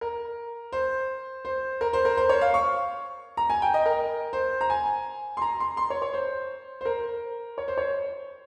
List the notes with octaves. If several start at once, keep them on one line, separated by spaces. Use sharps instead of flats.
A#4
C5
C5
A#4
C5
A#4
C5
C#5
F5
C#6
A#5
G#5
G5
D#5
A#4
C5
A#5
G#5
C6
A#5
C6
C6
C#5
C#5
C5
C5
A#4
C#5
C5
C#5